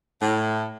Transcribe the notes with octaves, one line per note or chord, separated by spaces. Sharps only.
A2